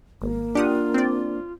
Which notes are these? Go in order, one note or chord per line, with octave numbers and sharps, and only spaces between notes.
G#1 A#3
D4 F4 G4 F#5 D#6
C4 D5